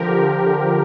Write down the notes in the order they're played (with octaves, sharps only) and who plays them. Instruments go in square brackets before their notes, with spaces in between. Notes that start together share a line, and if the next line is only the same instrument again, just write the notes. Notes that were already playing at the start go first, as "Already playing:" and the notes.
Already playing: [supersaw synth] D3 F3 G4 A#4